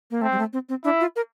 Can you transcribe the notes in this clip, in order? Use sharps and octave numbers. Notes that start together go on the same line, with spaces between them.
A#3
A3 C4
G3
A3
C4
C4
D4 E4
F4
A#4